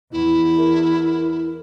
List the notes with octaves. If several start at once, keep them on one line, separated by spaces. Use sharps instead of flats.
E2 E4
A#4